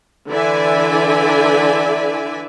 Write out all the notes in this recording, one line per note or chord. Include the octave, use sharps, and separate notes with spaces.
D3 E3 D5 E5 G#5